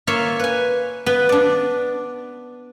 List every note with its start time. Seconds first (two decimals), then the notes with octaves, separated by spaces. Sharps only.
0.07 A#3 F4 C#5 E5
0.39 B4 G#5
1.06 B3 B4
1.29 D4 D5